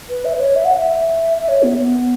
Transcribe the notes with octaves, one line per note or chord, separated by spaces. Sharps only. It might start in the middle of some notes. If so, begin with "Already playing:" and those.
B4
E5
B4
C#5
E5
F#5
E5
E5
C#5
B3
B3